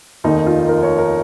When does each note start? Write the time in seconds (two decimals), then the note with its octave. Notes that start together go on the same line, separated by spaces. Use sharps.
0.24 F1 D#2 D#3 A#3 D#4
0.46 F4
0.68 A#4
0.83 C#5
0.98 A#4